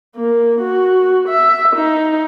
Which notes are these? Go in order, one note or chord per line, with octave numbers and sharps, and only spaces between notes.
A#3
F#4
E5
D#4